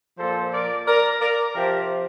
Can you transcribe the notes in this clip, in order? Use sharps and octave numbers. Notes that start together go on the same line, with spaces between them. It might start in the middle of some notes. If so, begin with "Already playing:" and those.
A#2 F3 A4 C5
A#4 D5
A#4 D5
A#4 D5
C3 F3 G4 A#4